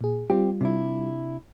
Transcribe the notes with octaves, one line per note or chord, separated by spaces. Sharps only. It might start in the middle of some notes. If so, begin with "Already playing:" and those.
A#2 G#4
G3 C4 F4 G4
C3 D4 E4